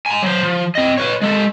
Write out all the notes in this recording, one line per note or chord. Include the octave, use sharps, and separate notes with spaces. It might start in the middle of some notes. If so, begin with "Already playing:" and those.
G#5 A#5
F#3 C5
F3
C4 D#5
B4 C#5
G#3 A4